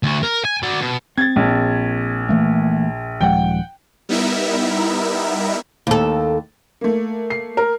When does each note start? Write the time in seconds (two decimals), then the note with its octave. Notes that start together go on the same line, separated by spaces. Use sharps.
0.03 D2 F#4
0.23 A#4
0.45 G#5
0.63 F#4 D5
0.81 B2
1.18 C4 G#6 A6
1.36 A#1
2.29 E3 A3 A#3
3.21 D#1 F3 G#3 F#5 G5
4.09 G3 B3 D#4 E4 A#4 E5
5.87 D#2 A4
6.81 A3 A#3
7.30 C7
7.57 A#4